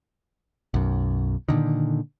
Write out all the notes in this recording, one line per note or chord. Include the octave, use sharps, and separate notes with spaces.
B1 F#2
A#2 D3 D#3